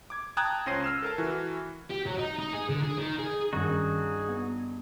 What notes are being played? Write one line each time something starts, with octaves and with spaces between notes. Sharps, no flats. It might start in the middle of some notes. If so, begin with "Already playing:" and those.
D6 G#6
G5 A5 A#5 D#6 F#6 G#6
C#2 C#4 C5 A#6 C7 D#7
E6 F6 E7
A4 A#4 A5
E3 F#4
G4
F#3
D#4
D#4
G#4
D3
G#4
D#3
G#4
G2 D#3 C#4 D#4 F#4 G#4
B3